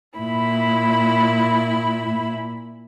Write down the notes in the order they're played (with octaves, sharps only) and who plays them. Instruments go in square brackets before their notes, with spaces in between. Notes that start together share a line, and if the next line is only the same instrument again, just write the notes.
[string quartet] A#2 E4 B5